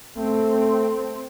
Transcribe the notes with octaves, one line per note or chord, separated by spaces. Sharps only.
A3 C4